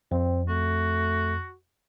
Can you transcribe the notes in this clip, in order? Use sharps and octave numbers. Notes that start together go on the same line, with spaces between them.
F2 C4
A3 F#4